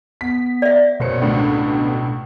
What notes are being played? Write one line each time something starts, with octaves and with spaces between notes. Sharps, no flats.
B3 B6
D5 E5
F#1 B2 C5 C#5 C#7
C#2 A2 D3 D4